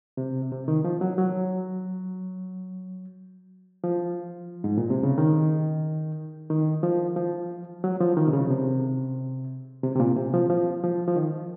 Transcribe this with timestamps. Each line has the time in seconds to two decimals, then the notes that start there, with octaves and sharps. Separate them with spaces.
0.17 C3
0.51 C3
0.68 D#3
0.84 F3
1.01 F#3
1.18 F#3
3.84 F3
4.64 G#2
4.78 A#2
4.90 C3
5.03 C#3
5.18 D#3
6.50 D#3
6.83 F3
7.16 F3
7.84 F#3
8.01 F3
8.17 D#3
8.27 C3
8.33 C#3
8.50 C3
9.83 C3
9.96 C3
10.00 A#2
10.16 C3
10.33 F3
10.50 F3
10.84 F3
11.08 F3
11.16 D#3